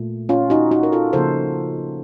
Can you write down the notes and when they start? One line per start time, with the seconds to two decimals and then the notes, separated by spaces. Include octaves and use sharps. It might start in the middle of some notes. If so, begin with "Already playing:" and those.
Already playing: A#2 A3
0.29 C#4 F4
0.50 D#4 F#4
0.71 D#4 F#4
0.83 A#4
0.92 F4 A4
1.13 C#3 F3 A#3 A4 C5